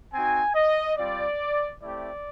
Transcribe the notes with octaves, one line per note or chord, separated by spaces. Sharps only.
C4 D#4 F#4 G#5
D#5
G3 C4 F4 D5
A3 C4 E4 G4 D5